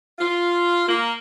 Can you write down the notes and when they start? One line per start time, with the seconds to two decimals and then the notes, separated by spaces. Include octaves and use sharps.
0.19 F4
0.88 A#3